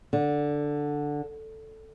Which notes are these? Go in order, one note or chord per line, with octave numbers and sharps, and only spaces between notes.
D3